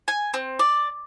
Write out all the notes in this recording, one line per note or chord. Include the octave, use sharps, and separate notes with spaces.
G#5
C4
D5